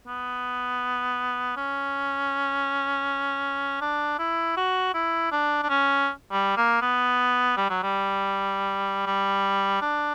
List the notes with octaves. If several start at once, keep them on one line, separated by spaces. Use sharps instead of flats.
B3
C#4
D4
E4
F#4
E4
D4
D4
C#4
G3
A#3
B3
G3
F#3
G3
G3
D4